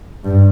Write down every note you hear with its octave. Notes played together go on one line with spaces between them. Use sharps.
G2